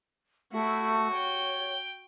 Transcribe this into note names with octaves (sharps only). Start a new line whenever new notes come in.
A3 E4 F#4
C#5 G5